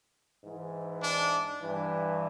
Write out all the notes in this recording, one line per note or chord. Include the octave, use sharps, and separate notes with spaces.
G#2 E3
D4
G2 E3